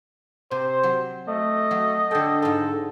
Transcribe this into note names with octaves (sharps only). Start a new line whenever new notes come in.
C3 C5
F#3
A3 D#5
F#3
D3 A4 G5
G#2 F4 A4